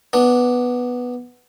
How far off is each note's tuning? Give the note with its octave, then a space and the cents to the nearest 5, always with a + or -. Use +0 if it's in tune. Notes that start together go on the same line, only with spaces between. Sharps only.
B3 +0 D4 +0